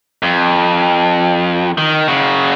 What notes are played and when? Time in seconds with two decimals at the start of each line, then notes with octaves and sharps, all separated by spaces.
0.22 F2
1.78 D#3
2.08 C#3 F#4